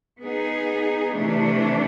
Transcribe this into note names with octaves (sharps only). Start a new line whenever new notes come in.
B3 D#4 G#4
C3 E3 A3 D4